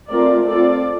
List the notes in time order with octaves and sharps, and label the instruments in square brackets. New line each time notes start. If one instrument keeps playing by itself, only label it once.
[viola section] A3 C4 F4 A#4 D5
C4 F4 A4 D5